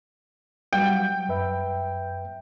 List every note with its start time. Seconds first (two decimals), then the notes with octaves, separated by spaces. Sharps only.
0.73 F#3 G3 F5 G5
1.29 F#2 B4 E5